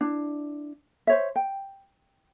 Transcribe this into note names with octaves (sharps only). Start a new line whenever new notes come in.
D4 E4
C5 C#5 E5
G5